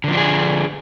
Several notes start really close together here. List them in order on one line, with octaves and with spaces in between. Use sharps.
D3 F3 D4 G#4